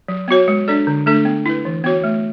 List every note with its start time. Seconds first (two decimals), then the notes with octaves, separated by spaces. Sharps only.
0.08 F#3
0.28 B3 F#4 C#5
0.48 G#3
0.68 D4 A4 D5
0.87 D3
1.06 A3 D4 A4
1.25 B3
1.46 E4 B4
1.65 E3
1.84 B3 F#4 C#5
2.04 A3